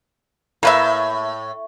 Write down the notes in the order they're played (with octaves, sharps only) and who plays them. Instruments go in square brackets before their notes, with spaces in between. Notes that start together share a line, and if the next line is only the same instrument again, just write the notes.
[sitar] A2 [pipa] A#3 B4 E5